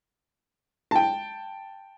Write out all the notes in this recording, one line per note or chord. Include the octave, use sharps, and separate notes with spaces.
G5 A5